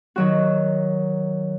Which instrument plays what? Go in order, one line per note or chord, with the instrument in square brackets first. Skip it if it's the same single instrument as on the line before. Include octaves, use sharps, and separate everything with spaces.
[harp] D#3 F#3 F#4